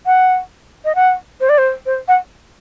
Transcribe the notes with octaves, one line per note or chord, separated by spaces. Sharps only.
F#5
D#5
F#5
C5
D5
C5
C5
F#5